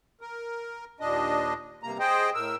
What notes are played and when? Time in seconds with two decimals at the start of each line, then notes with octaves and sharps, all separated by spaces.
0.21 A#4
1.00 D#2 A#2 D4 D#5
1.83 G2 C3 A#3 A#5
2.00 G#4 C5 D#5 G5
2.35 A2 A#4 E6